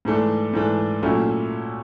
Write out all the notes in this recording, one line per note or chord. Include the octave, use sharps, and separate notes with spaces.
G#2 E3 A3 D4
G#2 E3 A3 D4
A#2 F#3 A3 C#4 E4